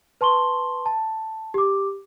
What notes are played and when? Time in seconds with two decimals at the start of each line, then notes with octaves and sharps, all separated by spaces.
0.21 B4 A5 C6 C#6 G7
0.86 A5
1.54 G4 D6